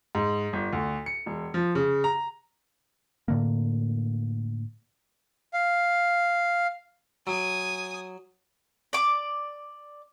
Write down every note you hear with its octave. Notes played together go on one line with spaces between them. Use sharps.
G#2
G1
D2
C#7
E1
F3
C#3
A#5
A2 D3 A#3
F5
F#3 G#5 D#6
D5 D6